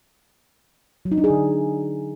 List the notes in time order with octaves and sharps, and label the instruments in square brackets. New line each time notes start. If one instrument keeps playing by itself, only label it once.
[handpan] F#3
D#4
D4
G#4
D3